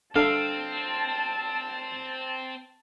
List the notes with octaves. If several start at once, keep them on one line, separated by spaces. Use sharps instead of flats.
C4 D4 A4 F5 A5